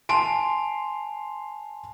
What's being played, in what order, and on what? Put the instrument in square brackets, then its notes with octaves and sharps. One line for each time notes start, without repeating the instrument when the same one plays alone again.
[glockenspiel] G#5 A5 F7 [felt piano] C6 D7